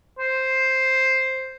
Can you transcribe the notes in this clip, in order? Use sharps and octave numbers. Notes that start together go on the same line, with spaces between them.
C5